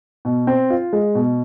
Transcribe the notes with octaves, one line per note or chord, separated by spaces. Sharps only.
B2
C4
F4
G#3
B2